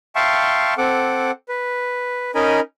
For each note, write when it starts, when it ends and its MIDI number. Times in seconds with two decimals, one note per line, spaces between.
0.15 0.74 76
0.15 0.74 77
0.15 0.74 79
0.15 0.74 81
0.15 0.74 84
0.15 0.74 85
0.78 1.31 60
0.78 1.31 69
0.78 1.31 78
0.78 1.31 86
1.49 2.31 71
2.35 2.60 61
2.35 2.60 63
2.35 2.60 70
2.35 2.60 75
2.35 2.60 80
2.35 2.60 83